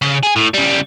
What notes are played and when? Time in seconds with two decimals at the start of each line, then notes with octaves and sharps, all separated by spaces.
0.02 C#3
0.23 G#4 G#5
0.36 A2
0.54 C#3 G3